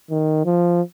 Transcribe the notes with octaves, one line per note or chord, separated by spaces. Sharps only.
D#3
F3